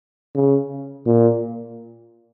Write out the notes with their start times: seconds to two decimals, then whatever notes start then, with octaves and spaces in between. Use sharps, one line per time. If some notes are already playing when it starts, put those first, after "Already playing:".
0.35 C#3
1.06 A#2